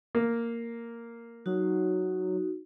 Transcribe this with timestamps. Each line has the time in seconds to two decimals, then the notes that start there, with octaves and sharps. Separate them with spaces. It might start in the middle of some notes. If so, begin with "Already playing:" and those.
0.15 A#3
1.46 F#3 D#4 F#4